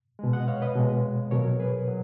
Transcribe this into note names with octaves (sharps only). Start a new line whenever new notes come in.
B2 G#3
D#5 F#5
C#5 F5
B4 D#5
B2 G#3
B2 F#3 A#4 C#5
G#4 B4
F#3